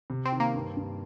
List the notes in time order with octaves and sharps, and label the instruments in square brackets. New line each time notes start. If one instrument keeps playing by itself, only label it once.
[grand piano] C3
[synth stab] C4
[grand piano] D#3
[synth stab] A#3
[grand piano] G2
G2